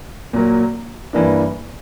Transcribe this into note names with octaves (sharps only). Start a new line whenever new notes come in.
A#2 F#3 A#3
G2 E3 A#3 D4